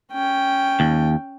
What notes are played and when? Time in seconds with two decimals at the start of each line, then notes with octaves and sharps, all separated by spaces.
0.12 C#4 G5
0.80 D#2